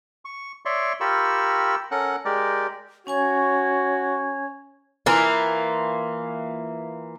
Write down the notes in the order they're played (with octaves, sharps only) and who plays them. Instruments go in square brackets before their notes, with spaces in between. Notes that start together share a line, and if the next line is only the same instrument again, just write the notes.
[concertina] C#6
C#5 D5 E5 C6 C#6
F4 G4 A#4 B5 C#6 E6
C#4 A4 A#4 F#5 F#6
G#3 G4 A#4 D5
[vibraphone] C#4 G#5 C#6 [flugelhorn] F#4 [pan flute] C#5
[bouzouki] E3 A#3 F4